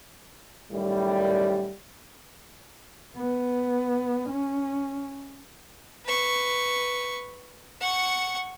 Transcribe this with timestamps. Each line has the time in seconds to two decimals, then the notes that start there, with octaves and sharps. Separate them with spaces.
0.72 F#2 A2 D#3 G3
3.17 B3
4.29 C#4
6.06 B4 C#6
7.81 F#5 C#6